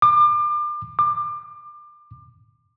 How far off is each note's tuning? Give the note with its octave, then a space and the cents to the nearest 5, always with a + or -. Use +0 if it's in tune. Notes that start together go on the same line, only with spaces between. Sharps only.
D6 +35
D6 +30